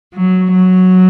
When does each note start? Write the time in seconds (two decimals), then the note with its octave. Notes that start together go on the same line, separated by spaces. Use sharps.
0.14 F#3
0.51 F#3